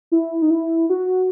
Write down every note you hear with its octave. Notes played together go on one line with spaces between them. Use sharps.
E4
D#4
E4
F#4